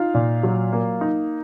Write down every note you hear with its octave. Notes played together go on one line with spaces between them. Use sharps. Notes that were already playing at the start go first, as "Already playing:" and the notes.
Already playing: D#4 F4 F5
A#2
F#3
A#3
D#4